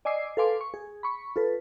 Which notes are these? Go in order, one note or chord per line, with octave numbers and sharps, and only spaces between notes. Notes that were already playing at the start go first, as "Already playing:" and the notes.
D5 D#5 G#5 D6 E6 C7
A4 B4 F5 G#5 C6 D6
C#6
G#4
B5 C#6
F4 A4 B4